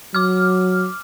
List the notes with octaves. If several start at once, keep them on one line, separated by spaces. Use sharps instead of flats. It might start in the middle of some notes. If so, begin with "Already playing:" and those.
F#3 D6 F6